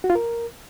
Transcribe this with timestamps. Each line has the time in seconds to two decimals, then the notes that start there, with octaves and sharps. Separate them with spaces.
0.04 F#4
0.10 F4
0.15 A#4